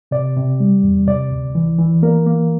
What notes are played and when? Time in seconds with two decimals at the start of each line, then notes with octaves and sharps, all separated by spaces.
0.11 C3 D5
0.36 C3
0.60 G3
0.83 E2
1.07 C3 D5
1.31 D2
1.55 E3
1.79 E3
2.02 A#3 A#4
2.27 A#3